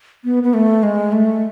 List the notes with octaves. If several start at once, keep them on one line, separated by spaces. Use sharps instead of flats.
B3
B3
A3
G#3
A3